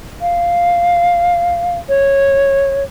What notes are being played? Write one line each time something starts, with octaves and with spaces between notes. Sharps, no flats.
F5
C#5